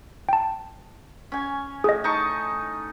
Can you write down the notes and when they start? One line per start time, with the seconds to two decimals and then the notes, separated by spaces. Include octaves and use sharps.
0.29 G5 A5
1.32 C#4 G#5
1.84 A2 G#4 D#5
2.04 D#4 A5 C#6